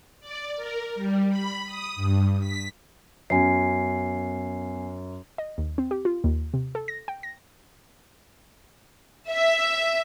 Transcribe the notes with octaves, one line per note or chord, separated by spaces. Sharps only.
D5
A#4
G3
B5
D#6
G2
B6
F#2 B3 G#5 C7
D#5
D#2
C4
G4
F4
D#2
C3
A4
A#6
G5
A#6
E5